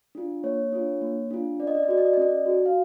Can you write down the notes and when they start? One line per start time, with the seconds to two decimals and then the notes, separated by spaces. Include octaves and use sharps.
0.15 D4 F4
0.43 A#3 C#5
0.72 D4 F4
1.02 A#3
1.31 D4 F4
1.59 C#4 D5
1.67 D#5
1.75 D5
1.83 D#5
1.88 F#4 A4 D5
1.98 D#5
2.06 D5
2.14 D#5
2.17 C#4 D5
2.46 F#4 A4
2.66 F5